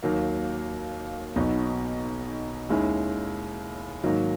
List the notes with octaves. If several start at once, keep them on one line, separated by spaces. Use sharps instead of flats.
D#2 D#3 F#3 A#3
B1 B2 F#3 B3 D#4
D#2 D#3 G#3 C#4 E4
G#2 D#3 F#3 A#3